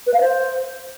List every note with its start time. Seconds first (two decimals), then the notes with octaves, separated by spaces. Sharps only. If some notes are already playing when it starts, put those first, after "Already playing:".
0.06 B4
0.13 F5
0.21 C5